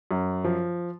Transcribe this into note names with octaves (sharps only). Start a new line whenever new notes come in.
F#2
F3